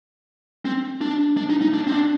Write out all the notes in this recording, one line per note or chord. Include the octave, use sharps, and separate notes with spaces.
C4
D4
D4
D#4
D#4
D4
C4
D4